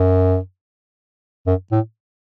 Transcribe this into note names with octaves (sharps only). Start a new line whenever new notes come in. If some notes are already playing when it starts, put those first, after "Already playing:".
Already playing: F#2
F#2
A2